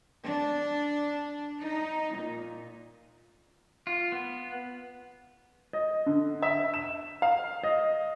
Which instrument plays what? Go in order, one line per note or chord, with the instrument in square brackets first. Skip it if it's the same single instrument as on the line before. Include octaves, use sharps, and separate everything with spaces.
[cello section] D4
D#4
A#2
[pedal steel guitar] F4
B3
[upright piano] D#5
D3
E5
E7
F5
D#5